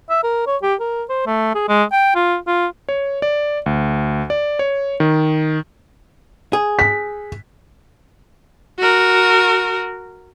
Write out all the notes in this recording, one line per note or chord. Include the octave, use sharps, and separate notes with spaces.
E5
A#4
C#5
G4
A#4
C5
A3
G#4
G#3
G5
F4
F4
C#5
D5
D2
D5
C#5
D#3
G#4
B6
F#4 A#4